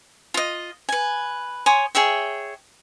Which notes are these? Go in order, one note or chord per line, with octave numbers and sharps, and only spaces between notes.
F4 D#5
B4 G#5
C#5 G#5 C6 D#6
G#4 C#5 E5 G5